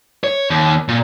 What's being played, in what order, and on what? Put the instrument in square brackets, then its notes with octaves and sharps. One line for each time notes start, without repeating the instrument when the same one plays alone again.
[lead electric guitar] C#5
D#2
A#2